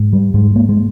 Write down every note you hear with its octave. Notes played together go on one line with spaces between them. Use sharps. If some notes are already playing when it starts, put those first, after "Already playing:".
Already playing: G#2
G3
G#2 G#3
A#3
G#3